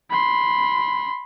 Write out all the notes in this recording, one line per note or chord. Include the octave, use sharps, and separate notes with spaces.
B5 C6